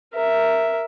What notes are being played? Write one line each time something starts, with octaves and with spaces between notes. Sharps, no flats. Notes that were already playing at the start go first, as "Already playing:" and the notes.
A#4 E5